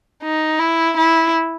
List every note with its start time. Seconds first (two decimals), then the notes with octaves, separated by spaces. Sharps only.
0.23 D#4
0.60 E4
0.97 E4